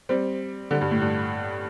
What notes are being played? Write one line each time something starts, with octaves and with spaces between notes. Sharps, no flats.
G3 C4
D3 G3
G2
A2
G2